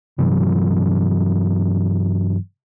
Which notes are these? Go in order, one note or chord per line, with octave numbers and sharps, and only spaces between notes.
G2 C3 E3 F#3